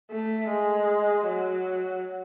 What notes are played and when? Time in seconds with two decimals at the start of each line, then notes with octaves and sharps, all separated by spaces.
0.11 A3
0.50 G#3
1.27 F#3